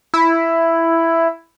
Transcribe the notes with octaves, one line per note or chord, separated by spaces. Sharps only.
E4